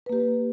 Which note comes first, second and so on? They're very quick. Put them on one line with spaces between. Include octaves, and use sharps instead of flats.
B4 A#3 G4